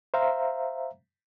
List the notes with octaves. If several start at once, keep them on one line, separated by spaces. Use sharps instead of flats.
C5 E5 F5 A#5